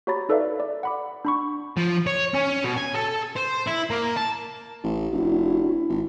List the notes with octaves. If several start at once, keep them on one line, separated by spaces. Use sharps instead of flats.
F#4 G4 C#5 A#5 B5 A6
D#4 A4 B4 D5 E5 F5
D5
F#5 B5 D6
D4 B5 C#6
F3
C#5
C#4
B2
G#5
A4
C5
E4
A#3
A5
A1
F1 D4 E4 F#4
G#1